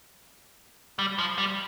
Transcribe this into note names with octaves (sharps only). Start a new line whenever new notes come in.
G3
F3
G3